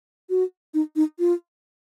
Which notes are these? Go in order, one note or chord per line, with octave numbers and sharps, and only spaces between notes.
F#4
D#4
D#4
F4